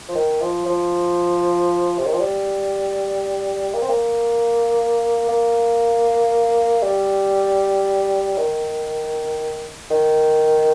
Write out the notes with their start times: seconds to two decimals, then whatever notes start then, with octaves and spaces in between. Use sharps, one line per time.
0.08 F3
0.15 D#3
0.41 F3
0.66 F3
1.98 C3
2.06 D#3
2.13 F3
2.20 G3
3.74 A#3
3.82 C4
3.89 A#3
5.29 A#3
6.83 G3
8.37 D#3
9.91 D#3